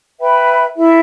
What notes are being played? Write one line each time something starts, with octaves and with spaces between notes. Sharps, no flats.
B4 E5 G5 B5
E4 A4 E5